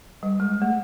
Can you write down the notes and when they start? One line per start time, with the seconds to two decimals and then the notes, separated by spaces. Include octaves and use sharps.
0.23 G3
0.40 G#3
0.62 A3